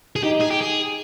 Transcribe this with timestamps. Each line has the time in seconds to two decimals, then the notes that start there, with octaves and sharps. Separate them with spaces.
0.16 G#4
0.23 D#4 G4
0.41 G#4
0.51 G4
0.61 G#4